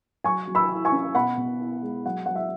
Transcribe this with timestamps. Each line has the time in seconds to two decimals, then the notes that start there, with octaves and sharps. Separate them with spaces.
0.24 F#3 G#5 C#6
0.47 F#3
0.55 B5 E6
0.69 E4
0.85 G#5 C#6
0.92 C#4
1.15 B2 F#5 B5
1.37 B2
1.60 E4
1.83 G#3
2.06 F#3 F#5
2.26 F#3 F#5
2.36 E5